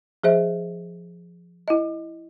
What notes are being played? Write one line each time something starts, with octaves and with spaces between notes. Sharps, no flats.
F3 G#4 C5 E5
E4 D#5